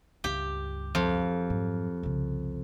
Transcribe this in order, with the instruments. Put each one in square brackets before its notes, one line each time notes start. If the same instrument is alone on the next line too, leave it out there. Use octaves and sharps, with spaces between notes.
[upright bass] C#2 G2 [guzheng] G4
[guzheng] F2
[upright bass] G#2 F#3
C2 C#3